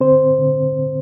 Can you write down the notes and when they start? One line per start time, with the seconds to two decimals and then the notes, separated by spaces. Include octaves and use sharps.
0.01 D3 C4 C5
0.39 D3